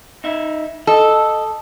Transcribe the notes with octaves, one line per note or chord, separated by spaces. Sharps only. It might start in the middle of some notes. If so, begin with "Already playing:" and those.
D#4 E5
A4 D#5